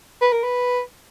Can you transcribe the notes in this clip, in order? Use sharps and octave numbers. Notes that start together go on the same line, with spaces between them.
B4
A#4
B4